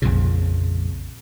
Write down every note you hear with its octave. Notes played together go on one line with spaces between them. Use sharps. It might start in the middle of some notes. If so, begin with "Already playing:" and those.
A#1 F2 A#2 C#3